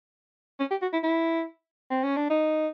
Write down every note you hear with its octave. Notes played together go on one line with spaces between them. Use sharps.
C#4
G4
F#4
E4
E4
C4
C#4
D4
D#4